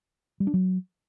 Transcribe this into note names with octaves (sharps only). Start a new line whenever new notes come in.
G3
D4
F#3